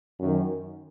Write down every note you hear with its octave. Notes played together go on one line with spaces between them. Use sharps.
F#2 D#3